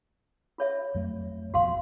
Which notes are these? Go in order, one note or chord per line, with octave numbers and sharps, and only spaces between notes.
F4 C#5 E5
F2 F#3 A3
G#1 F2 B2 F#4 F5 C6